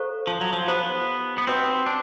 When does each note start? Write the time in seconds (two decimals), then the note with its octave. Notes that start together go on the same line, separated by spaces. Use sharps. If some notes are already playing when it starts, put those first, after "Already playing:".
Already playing: A4 C5 F5 A#5 C#6
0.27 F3
0.41 F#3
0.53 F3
0.67 B3 D#4 G4 C5
1.38 B3
1.47 C4 D#4 F#4 B4 D#5 F#5
1.86 D4